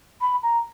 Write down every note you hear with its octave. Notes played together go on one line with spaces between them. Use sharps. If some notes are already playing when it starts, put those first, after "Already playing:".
B5
A#5